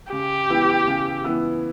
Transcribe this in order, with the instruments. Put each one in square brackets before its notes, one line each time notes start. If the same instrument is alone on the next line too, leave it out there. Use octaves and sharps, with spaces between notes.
[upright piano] C#3 [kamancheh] G4
[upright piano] E3 B3 E4
C#3
E3 B3 E4